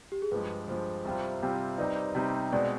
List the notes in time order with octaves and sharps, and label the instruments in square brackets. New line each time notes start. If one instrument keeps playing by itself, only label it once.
[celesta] G4
G#4
[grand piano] G2 F3 G#3 [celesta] B4
[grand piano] G2 F3 G#3 [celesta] C5
[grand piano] C2 C3 G3 C4 F4
C2 C3 G3 C4 F4
[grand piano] C3 G3 C4 D#4 [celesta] B4 D5
[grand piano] C3 G3 C4 D#4
[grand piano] B2 G#3 C4 [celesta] B4 D5